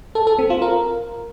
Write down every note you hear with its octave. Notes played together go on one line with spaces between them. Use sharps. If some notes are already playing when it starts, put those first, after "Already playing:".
A4
A4
C4
F4
A#4